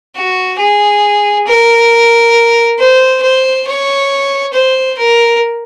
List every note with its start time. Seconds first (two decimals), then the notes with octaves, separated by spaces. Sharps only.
0.15 F#4
0.59 G#4
1.47 A#4
2.79 C5
3.22 C5
3.67 C#5
4.54 C5
4.98 A#4